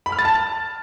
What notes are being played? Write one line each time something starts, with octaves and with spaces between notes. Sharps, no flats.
B5
F6
A6
A5